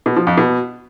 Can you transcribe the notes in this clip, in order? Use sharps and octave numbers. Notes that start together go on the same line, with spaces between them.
B2
F3
F2
B2